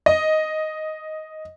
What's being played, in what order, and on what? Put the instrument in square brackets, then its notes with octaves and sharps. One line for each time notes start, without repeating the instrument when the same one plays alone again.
[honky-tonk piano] D#5